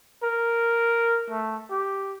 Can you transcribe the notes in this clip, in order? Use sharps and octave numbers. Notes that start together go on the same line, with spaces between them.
A#4
A3
G4